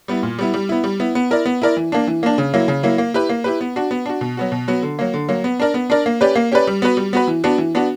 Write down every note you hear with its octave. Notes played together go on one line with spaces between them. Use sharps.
G3 B3 E4
A#2
G3 B3 E4
G3
B3 E4
G3
B3 E4
B3
E4 A#4 D5
B3
E4 A#4 D5
E3
A#3 D4
E3
A#3 D4
C#3
F#3 A#3 E4
C#3
F#3 A#3 E4
A#3
E4 G4 B4
A#3
E4 G4 B4
B3
D4 F#4
B3
D4 F#4
B2
F#3 B3 F#4
B2
F#3 B3 F#4
D3
F#3 A#3
D3
F#3 A#3
B3
D4 A#4 D5
B3
D4 A#4 D5
A#3
C#4 G4 B4 D5
A#3
C#4 G4 B4 D5
G3
B3 F#4 B4
G3
B3 F#4 B4
E3
B3 D4 F#4
E3
B3 D4 F#4